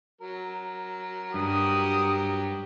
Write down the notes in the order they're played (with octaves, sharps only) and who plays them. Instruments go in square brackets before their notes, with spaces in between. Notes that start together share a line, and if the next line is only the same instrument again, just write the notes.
[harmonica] F#3 A#4
[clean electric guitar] G2 [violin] F#4 G4 [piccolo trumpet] D#6